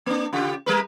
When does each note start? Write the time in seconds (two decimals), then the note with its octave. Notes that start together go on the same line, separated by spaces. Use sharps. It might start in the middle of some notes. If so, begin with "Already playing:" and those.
0.06 A#3 D4
0.33 C#3 F4 G4
0.66 G3 A#4 B4